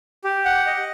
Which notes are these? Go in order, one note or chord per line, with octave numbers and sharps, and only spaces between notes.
G4
F#5
D#5